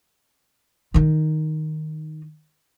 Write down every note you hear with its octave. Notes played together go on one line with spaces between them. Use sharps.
D#3 D#4